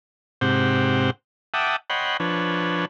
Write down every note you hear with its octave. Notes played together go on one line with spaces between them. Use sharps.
G#2 C3 C4 G4 C5 F#5
E5 F#5 G5 A5 D6 D#6
C#5 D#5 F#5 G5 B5 C6
F3 D4 B4 C#5